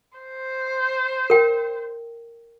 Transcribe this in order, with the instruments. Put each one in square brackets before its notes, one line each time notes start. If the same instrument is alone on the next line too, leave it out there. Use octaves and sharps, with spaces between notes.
[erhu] C5
[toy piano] A#4 G5